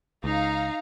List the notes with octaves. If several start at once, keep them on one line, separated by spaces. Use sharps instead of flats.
C#2 D#4 F5 A#5